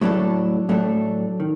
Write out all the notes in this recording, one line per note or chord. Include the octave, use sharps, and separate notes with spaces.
A2 F#3 A3 D4 A4
A2 F#3 A3 D4 A4
D#3